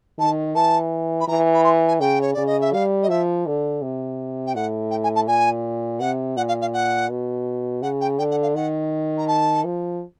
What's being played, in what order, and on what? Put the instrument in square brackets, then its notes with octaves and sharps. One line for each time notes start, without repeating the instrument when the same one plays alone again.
[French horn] D#3 [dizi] A5
[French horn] E3 [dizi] A5
[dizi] B5
[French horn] E3 [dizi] A#5
[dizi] B5
C6
G#5
[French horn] C#3 [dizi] G5
[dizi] C#5
[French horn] C#3 [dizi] D5
[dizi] D#5
E5
[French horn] G3 [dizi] F5
[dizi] D#5
[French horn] F3 [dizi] E5
[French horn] D3
C3
[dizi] G5
[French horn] A2 [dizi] F#5
[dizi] G5
G#5
A5
[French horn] A#2 [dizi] G#5
[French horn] C3 [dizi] F#5
[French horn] A#2 [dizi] F#5
[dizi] F5
F5
F#5
[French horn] B2
[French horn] C#3 [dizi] F#5
[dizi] G5
[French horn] D3 [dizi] G5
[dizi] F#5
F5
[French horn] D#3 [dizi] F#5
[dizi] A#5
A5
[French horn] F3